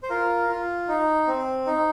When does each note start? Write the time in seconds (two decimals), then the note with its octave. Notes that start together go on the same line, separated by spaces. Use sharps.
0.03 C5
0.10 F4 A#4
0.49 F4
0.88 D#4
1.27 C4
1.66 D#4